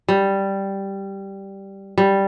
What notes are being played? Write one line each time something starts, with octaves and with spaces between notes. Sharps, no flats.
G3
G3